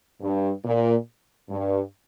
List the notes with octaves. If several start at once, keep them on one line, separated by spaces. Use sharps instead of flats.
G2
A#2
G2